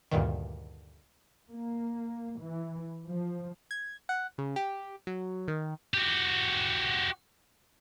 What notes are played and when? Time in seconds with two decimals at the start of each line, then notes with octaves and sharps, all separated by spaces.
0.11 D2 G2 A#2 D#3
1.50 A#3
2.41 E3
3.06 F3
3.71 G#6
4.09 F#5
4.38 C#3
4.56 G4
5.07 F#3
5.48 D#3
5.94 F#4 G4